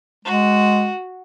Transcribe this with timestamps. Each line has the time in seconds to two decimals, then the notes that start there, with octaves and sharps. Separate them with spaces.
0.25 G#3 F#4